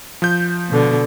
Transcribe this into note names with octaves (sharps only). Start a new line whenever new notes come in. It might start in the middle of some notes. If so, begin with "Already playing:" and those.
F3 G6
B2 D3